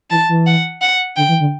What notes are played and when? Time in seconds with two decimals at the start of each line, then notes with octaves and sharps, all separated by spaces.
0.10 E3 A5
0.29 E3
0.46 F#5
0.81 F#5
1.16 D3 G5
1.29 E3
1.40 D3